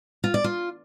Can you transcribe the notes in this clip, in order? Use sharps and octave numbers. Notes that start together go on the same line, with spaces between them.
F4
D5
F4